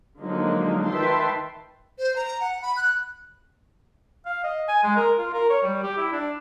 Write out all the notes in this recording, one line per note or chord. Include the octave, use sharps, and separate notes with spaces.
D3 F3 F#3 G#3 A#3 D#4
D#3 B4 E5 G5 A5 C6
C5
A#5
F#5
B5
F#6
F5
D#5
G#5
G#3
A#4
F4
A#4
C#5
G3
G4
E4
D4